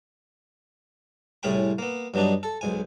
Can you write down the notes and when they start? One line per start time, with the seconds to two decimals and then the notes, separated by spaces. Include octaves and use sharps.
1.43 C2 A2 C#4 G#4 G5 B5
1.78 A#3 B3
2.14 G2 F#3 B3 D4 D#4
2.43 A4
2.61 B1 G#2 G#5